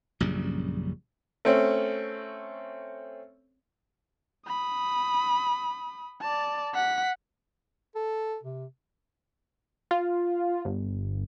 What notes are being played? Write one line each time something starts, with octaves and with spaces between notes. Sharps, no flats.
A#1 F#2 C#3 G3
A3 C4 C#4
B5 D#6
D5 A5
F#5 B6
A4
C3
F4
G1